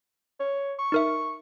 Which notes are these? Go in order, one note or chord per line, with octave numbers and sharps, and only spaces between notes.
C#5
C#6
D#4 A#4 E5